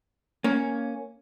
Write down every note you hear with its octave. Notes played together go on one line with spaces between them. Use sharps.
A#3 C#4